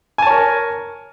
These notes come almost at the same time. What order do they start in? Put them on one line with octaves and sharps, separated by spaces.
G#5 A5 C#5 A#4